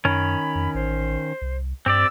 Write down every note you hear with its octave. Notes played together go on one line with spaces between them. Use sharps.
F#2 D#3 C#4 B5
F2
A1 C5
C2
G2 C4 G4 D5 E6